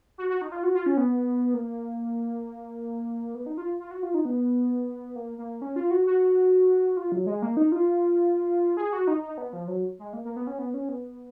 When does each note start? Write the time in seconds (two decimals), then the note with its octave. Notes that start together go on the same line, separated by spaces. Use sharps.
0.18 F#4
0.29 F#4
0.41 D#4
0.52 F4
0.63 F#4
0.75 F4
0.86 C#4
0.97 B3
1.54 A#3
3.35 B3
3.46 D#4
3.58 F4
3.80 F4
3.91 F#4
4.03 F4
4.14 D#4
4.25 B3
5.16 A#3
5.38 A#3
5.62 C#4
5.76 F4
5.91 F#4
6.06 F#4
6.97 F4
7.12 F#3
7.27 G#3
7.42 A#3
7.57 D#4
7.72 F4
8.77 G#4
8.93 F#4
9.07 D#4
9.23 D#4
9.38 B3
9.53 F3
9.68 F#3
9.99 G#3
10.13 A#3
10.25 A#3
10.36 B3
10.47 C#4
10.59 B3
10.74 C#4
10.89 B3